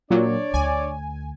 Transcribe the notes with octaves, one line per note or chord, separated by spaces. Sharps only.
A#2 F#3 D4 C#5 D5
D2 G#5